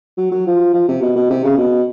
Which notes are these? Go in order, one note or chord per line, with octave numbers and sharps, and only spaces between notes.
F#3
F#3
F3
F3
C3
B2
B2
C3
C#3
B2